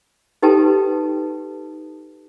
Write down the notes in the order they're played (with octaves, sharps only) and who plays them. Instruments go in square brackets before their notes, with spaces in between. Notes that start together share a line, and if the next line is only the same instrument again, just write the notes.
[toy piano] D#4 G4 A4 B4 G5 A5